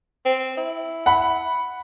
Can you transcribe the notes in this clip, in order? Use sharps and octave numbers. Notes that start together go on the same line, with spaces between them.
C4
E4
F#5 B5